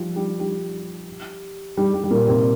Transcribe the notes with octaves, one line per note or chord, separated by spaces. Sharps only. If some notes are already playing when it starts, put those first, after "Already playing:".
Already playing: F3 G3
G3
G3
G3
G3
G3
A#2 A#3
C3 C4